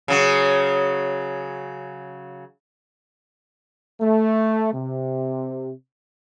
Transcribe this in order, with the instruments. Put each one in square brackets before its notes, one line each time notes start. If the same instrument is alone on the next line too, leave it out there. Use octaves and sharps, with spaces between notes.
[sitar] C#3 F#3
[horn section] A3
C3